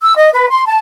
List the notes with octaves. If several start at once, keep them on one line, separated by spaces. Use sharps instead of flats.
E6
D#5
B4
C6
A5